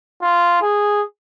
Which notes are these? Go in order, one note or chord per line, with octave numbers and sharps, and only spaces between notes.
F4
G#4